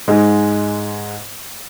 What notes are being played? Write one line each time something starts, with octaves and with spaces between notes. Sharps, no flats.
G#2 G#3